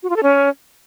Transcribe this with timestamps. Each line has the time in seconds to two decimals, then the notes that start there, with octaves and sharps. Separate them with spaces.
0.03 F#4
0.10 F4
0.16 A4
0.23 C#4